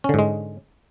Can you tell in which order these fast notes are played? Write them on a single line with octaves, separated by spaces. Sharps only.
C#4 D3 G#2 G#3